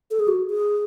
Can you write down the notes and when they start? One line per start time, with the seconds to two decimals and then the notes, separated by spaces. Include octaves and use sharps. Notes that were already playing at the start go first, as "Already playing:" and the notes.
0.11 A4
0.20 G#4
0.28 F#4
0.50 G#4